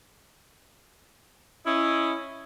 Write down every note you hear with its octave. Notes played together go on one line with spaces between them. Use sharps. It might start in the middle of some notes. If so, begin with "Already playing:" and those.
C#4 E4 D#5